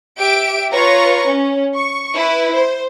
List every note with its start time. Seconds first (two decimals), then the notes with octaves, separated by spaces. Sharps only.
0.19 G4 E5 D7
0.73 F4 B4 C#5 A#5 C#6
1.28 C#4
1.75 C#6
2.15 E4 B4
2.55 C5